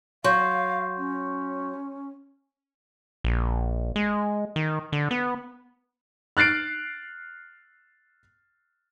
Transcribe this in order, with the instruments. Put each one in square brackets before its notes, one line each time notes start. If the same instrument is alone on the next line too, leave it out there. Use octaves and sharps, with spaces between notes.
[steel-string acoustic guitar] F#3 [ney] F5 [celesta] C6 C#6 G6
[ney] C#4
[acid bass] A#1
G#3
D#3
D3
B3
[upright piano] F6 F#6 A6 C7 D7